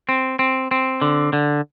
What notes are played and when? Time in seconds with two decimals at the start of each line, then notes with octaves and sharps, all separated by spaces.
0.09 C4
0.39 C4
0.71 C4
1.02 D3
1.33 D3